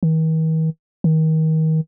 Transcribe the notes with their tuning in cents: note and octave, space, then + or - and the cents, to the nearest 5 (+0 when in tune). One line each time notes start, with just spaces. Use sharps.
D#3 +45
D#3 +30